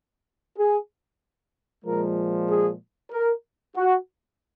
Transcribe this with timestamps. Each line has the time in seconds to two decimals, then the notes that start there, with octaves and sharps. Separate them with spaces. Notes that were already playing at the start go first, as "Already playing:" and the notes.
0.58 G#4
1.85 A#2 F3 G#3 A#4
2.50 G#4
3.12 A#4
3.77 F#4